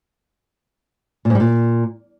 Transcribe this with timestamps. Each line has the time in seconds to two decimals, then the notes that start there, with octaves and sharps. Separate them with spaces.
1.25 A#2
1.30 G#2
1.35 G3
1.40 A#2